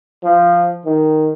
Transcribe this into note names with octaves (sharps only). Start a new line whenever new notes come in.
F3
D#3